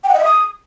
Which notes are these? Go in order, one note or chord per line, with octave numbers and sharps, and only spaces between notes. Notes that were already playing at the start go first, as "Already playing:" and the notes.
G5
F#5
D#5
E5
D#6